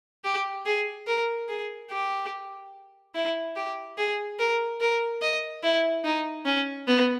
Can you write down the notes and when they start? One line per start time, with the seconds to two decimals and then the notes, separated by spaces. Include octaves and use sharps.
0.24 G4
0.66 G#4
1.07 A#4
1.49 G#4
1.91 G4
3.15 E4
3.56 G4
3.98 G#4
4.39 A#4
4.81 A#4
5.22 D#5
5.63 E4
6.04 D#4
6.46 C#4
6.88 B3